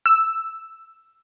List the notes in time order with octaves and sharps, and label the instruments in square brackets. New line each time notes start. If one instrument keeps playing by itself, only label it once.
[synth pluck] E6